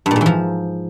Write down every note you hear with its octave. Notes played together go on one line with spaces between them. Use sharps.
G2
A#2
G#2
E3
F3